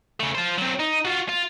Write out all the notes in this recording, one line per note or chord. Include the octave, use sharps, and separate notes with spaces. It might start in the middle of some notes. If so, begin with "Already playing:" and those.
C#3 A3
F4 C5
F#3 C4
D#4
F4 F#4
F4